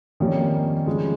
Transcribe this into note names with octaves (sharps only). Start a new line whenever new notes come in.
F2 D#3 G3 A#3 C#4
C#3 F3 G#3